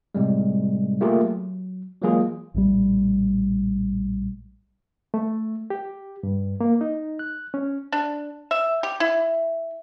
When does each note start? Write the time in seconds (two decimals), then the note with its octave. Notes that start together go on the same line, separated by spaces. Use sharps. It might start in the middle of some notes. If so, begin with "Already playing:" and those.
0.15 A2 C3 G3 G#3
1.01 A3 A#3 F4 G4 G#4 A#4
1.22 F#3
2.02 E3 F#3 G#3 A#3 F4 G#4
2.54 A#1 A2 D#3 G3
5.14 A3
5.70 G4
6.23 G2
6.60 A#3
6.81 D#4
7.19 F#6
7.54 C#4
7.92 D4
8.51 E5
8.83 G4
9.00 E4